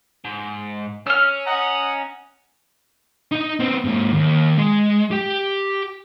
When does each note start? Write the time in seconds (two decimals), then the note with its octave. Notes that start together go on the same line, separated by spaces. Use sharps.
0.25 G#2
1.07 C#4 E6 F6
1.47 D#5 F#5 A#5
3.32 D#4 D#5
3.60 B3 C4
3.84 G#2 A#3
4.14 D#2
4.58 G#3
5.11 G4 G5